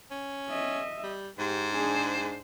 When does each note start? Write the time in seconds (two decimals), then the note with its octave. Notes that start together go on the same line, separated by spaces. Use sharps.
0.11 C#4
0.50 D#5 E5
1.04 G3
1.39 G#2 G4 C5
1.74 D4 G#4